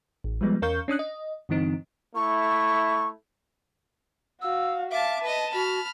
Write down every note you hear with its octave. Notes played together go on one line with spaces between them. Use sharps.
A1
F3 G3 G#3 B3
E2 C#4 A#4 F5 C#6 G6
C#4 D4 D#6 F#6
D#5
G2 D3 E3 C4 D#4
A3 E4 C#6
F#4 F5 E6
E5 F5 A5 D6
B4 D#5 A5
F#4 B5 F6